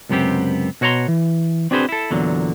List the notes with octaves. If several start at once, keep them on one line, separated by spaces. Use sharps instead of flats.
C#2 F#2 C3 B3 C4 G4
B2 F#4 C#5 D5 A#5 C6
E3
C4 D4 F#4 G#4 B4 C5
E4 A4
E2 A#2 D3 F#3